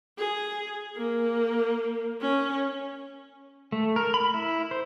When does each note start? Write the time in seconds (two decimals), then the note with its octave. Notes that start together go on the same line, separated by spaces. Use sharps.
0.18 G#4
0.97 A#3
2.21 C#4
3.72 A3
3.96 A#4
4.14 B5
4.34 E4
4.71 C5